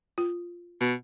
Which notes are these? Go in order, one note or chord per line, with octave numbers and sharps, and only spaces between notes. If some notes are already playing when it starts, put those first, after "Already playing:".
F4
B2